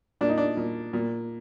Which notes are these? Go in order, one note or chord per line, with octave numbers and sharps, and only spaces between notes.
A#2 D4
D#4
D4
A#2
A#2